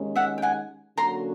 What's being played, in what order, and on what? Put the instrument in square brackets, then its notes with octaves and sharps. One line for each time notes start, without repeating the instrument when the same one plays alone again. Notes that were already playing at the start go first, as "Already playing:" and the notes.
Already playing: [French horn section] D#2 D#3 G#3 C#4
[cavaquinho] E5 F#5
G5
F#5 G#5
[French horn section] D3 F#3 A#3 C#4 F#4 [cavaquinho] A#5 C6